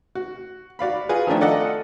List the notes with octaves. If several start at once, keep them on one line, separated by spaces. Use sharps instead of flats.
F#4
F#4 D5 F5 B5
F4 F#4 G#4 B4
D#3 F3 A3 D4
F4 A4 D5 D#5 F#5